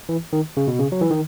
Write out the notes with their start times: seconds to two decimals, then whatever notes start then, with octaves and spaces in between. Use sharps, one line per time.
0.09 E3
0.33 D#3
0.57 C#3
0.67 B2
0.79 C#3
0.92 F#3
1.01 E3
1.10 D#3